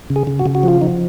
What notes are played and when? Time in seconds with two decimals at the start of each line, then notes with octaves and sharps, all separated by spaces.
0.10 C#3
0.16 G#4
0.27 C#3
0.39 F#4
0.46 C#3
0.55 F#4
0.63 F3 F4
0.81 F3 D#4